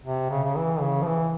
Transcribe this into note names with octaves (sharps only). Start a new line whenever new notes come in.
C3
C#3
C#3
E3
C#3
F3
E3